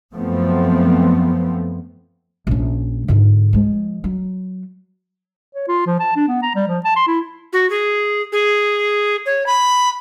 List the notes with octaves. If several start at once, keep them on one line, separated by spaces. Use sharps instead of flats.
F#2 F3 A3 B3 C4
A#1 C#4
G#2 D3
F3 G#3
F#3
C#5
F4
F3
A5
D4
B3
A#5
G3
F3
A5
C6
E4
F#4
G#4
G#4
C#5
B5